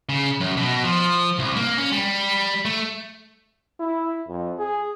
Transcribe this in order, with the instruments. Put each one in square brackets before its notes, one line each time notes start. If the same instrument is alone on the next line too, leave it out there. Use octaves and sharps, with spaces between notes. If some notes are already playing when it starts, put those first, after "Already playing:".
[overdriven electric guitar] C#3
F#2
B2
F3
C2
A#3
C#4
G3
A3
[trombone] E4
F2
G#4